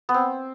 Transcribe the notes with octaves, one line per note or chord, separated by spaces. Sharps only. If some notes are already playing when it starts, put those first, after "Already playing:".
B3
C4